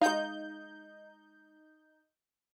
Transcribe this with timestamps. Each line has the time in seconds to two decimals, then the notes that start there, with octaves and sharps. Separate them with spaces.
0.01 G#3 D#4 F5 G6